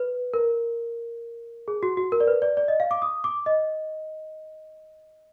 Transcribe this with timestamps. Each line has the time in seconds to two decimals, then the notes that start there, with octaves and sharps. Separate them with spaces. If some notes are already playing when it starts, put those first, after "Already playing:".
Already playing: B4
0.34 A#4
1.68 G#4
1.83 F#4
1.97 F#4
2.12 A#4
2.20 D5
2.28 B4
2.42 D5
2.57 D5
2.68 D#5
2.80 F5
2.91 D6
3.02 D#6
3.24 D6
3.46 D#5